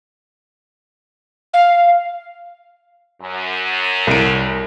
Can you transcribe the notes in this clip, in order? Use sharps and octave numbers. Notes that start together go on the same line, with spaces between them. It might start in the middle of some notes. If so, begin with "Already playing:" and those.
F5
F#2
C2 D7